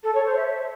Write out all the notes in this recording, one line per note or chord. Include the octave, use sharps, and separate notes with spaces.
A4
C#5
C5
E5